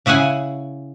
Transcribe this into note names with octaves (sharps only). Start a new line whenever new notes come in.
C#3 E4 G#4 F#5 G#5